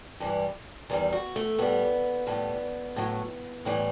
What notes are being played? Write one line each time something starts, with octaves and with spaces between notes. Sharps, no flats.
G2 E3 G3
E2 D#3 G3
F#4
A3
A2 G3 B3
A2 G3 B3
A2 F#3
A2 E3 G3